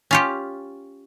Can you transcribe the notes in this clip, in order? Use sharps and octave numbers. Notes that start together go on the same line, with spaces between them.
C#4 F4 G4